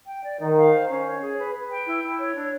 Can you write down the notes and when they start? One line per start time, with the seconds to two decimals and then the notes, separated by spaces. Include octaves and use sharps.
0.08 G5
0.24 D5
0.41 D#3 D#4
0.57 F5
0.73 C5
0.89 C#4
1.06 C#5
1.22 G#4
1.39 B4
1.55 B4
1.70 G5
1.87 E4
2.03 E4
2.19 C#5
2.35 D4